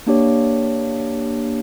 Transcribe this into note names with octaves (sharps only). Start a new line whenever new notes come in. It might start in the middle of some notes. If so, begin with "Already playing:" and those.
A#3 D4 G4 C#5